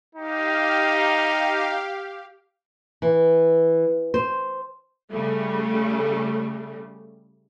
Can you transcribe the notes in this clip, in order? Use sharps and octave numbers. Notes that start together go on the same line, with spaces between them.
D#4 G4 F5
E3
C5
C#3 G3 A3